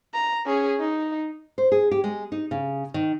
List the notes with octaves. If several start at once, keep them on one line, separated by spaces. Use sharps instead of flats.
A#5
C#4 G#4
D#4
C5
G#4
G4
G#3
D#4
C#3
D#3